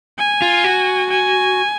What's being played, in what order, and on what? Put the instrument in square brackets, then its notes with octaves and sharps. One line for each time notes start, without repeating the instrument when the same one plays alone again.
[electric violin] G#5
[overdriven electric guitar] F4
F#4
[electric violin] G#5